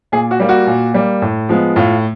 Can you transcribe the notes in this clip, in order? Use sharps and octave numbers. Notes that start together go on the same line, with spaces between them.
A#2 G#4
F#4
G3 A#3
F#4
A#2
G3 A#3
A2
F3 G#3 B3
A2 F4